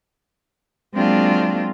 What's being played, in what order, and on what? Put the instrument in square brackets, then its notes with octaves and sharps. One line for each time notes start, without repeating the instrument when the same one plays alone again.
[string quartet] F#3 G#3 A#3 C4 D4 F4